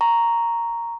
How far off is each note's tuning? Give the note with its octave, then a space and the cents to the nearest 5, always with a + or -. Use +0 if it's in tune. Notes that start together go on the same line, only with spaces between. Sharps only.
A#5 +0 C#6 +0